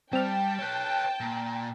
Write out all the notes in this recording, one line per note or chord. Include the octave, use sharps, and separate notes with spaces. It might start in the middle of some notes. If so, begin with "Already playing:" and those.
G3 C4 G5 A5 F6
B4 C#5
A#2